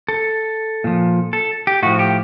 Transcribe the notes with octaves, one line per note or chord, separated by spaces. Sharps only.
A4
A#2 F3
A4
G4
A2 F3 F#4
G4